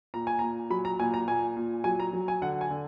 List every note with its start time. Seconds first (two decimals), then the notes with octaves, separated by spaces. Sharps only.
0.14 A#2 A#5
0.27 G#5
0.39 A#2 A#5
0.70 F#3 B5
0.85 A#5
0.99 A#2 G#5
1.14 A#5
1.28 A#2 G#5
1.57 A#2
1.84 F#3 G#5
2.00 A#5
2.13 F#3
2.28 G#5
2.42 D3 F#5
2.61 G#5
2.70 D3